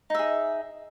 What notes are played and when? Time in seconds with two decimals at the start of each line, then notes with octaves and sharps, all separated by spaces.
0.10 D#4
0.14 E5
0.19 G#4